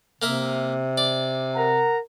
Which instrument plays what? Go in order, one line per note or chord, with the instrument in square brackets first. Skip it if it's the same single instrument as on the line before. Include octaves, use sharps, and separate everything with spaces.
[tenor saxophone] C3 [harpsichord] A#3 A#4 E5
[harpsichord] D5
[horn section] A#4 F#5 A#5